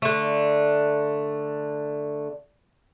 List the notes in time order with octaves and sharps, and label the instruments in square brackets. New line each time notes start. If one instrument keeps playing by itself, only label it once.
[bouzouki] D3 A3